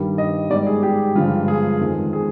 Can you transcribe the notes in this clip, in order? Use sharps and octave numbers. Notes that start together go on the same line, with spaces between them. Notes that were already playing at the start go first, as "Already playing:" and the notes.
Already playing: G2 D#3 G3
D#5
G#2 G3 D5
G#4
G4
G2 D3 F3 G#3 F4
G#4
F2 D#3 G#3
G#4